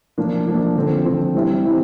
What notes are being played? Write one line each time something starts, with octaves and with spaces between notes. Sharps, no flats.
F3 A#3 D4
F3 A#3 D4
D3 F3 C4
D3 F3 C4
E3 G3 C4 E4
E3 G3 C4 E4